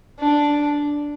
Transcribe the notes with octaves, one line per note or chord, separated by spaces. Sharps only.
D4